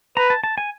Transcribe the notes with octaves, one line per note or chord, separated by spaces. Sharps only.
B4 A#5
A5
A5
G#5